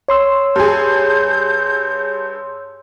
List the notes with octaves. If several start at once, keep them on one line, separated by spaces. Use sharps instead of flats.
C#5 C6 E6
G2 G#4 G6